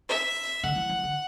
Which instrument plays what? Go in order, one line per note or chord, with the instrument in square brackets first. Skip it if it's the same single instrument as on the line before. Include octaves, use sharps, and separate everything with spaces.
[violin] E5
[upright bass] D3 [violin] F#5
[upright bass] E3
E3
D3